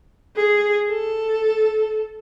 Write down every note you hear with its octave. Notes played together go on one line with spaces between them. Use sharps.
G#4
A4